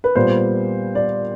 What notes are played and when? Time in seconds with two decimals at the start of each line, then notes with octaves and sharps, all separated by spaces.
0.04 B4
0.15 A#2 G3 B3 C5
0.95 D5